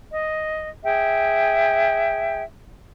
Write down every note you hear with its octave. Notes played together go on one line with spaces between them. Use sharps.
D#5
G#4 E5 G5